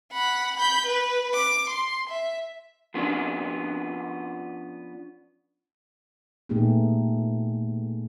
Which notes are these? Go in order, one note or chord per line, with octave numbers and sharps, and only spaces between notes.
F#5 B5
B5 G6
B4
D6
C6
E5
F3 B3 C#4 D4
A#2 A3 B3 D#4 G4 G#4